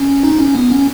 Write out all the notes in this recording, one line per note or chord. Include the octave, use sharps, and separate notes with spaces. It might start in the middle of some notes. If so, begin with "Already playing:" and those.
Already playing: C#4
D#4
C#4
B3
C#4